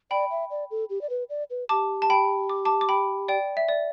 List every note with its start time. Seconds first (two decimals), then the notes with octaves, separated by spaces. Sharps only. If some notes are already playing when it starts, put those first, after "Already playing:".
0.11 D5 G5 B5
0.31 E5
0.50 D5
0.71 A4
0.90 G4
1.01 D5
1.10 B4
1.30 D5
1.50 B4
1.69 G4 A5 D6
2.02 A5
2.10 G5 B5
2.49 D6
2.65 A5 D6
2.81 D6
2.89 G5 B5
3.28 D5 G5
3.57 E5
3.69 D5